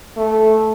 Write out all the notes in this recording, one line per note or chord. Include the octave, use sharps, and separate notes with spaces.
A3